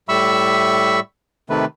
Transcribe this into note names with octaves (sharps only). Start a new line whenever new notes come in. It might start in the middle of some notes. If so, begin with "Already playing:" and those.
A2 G3 E5 B5 C#6 E6
C3 D#3 A3 B4